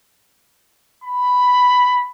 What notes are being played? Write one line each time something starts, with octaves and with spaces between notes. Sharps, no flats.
B5